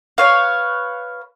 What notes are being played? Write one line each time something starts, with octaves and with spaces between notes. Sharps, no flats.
B4 C#5 F5